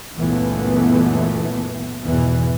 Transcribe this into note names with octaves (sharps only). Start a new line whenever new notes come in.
C#2 F#2 A#2 E3 A3 B3
G#1 E2 B2 E3